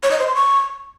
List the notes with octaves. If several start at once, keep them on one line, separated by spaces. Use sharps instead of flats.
C#5
D#5
C5
C6
C#6